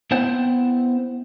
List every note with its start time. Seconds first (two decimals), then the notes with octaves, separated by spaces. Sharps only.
0.11 B3 C4 E4 C5 F#5 G5